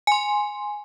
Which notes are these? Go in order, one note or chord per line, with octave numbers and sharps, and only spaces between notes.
G#5 C6